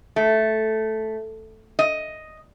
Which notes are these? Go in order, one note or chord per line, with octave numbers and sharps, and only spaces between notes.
A3
D#5